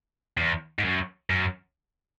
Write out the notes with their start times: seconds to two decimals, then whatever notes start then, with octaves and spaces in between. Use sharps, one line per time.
0.37 E2
0.79 G#2
0.84 F#2
1.30 F#2